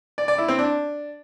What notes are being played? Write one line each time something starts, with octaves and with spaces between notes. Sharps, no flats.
D5
D5
E4
C4
D4